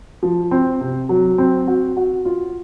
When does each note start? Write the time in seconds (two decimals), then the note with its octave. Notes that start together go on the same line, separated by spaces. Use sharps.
0.23 F3
0.51 C4
0.81 C3
1.09 F#3
1.38 C4
1.67 F#4
1.97 F#4
2.25 F4